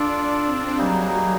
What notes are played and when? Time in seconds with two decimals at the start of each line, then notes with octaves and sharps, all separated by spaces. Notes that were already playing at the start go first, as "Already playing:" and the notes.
Already playing: D4 F4 A4 D5
0.45 C4
0.77 F#3 G3 A#3 D#4 G#4